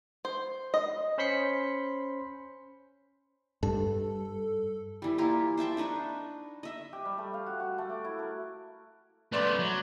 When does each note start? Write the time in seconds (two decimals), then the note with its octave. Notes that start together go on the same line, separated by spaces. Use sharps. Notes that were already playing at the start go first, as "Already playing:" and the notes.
0.25 C5
0.74 D#5
1.18 C#4 C5 B5 C6 B6 C#7
3.63 G2 A4
5.02 E3 G3
5.18 A#3 E4 F4 G4
5.57 C5 E5 G5 A5
5.77 D4 D#4 B4 C#6
6.63 D#5 E5
6.93 G4
7.05 G3
7.18 A3
7.34 F5
7.46 F#4
7.60 F#4
7.78 A3
7.90 D6
8.05 E4
8.19 A#4
9.32 A3 B3 B4 D5 C6
9.59 F#3